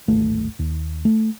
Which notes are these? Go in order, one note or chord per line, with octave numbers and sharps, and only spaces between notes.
D1 G#1 A3
D#2
A3